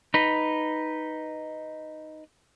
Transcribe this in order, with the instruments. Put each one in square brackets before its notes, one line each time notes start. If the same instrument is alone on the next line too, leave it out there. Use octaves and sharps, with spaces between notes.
[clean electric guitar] D#4 B4